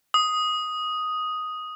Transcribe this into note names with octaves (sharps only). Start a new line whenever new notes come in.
D#6